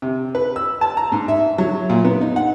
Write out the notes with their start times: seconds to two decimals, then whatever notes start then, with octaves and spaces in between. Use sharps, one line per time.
0.02 C3
0.35 B4
0.56 E6
0.81 A5
0.97 A#5
1.12 G#2
1.28 E5
1.58 F#3
1.90 A#2
2.05 B3
2.21 D#4
2.36 F#5